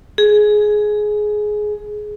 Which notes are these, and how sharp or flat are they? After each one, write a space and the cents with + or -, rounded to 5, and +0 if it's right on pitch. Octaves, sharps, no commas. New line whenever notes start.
G#4 +15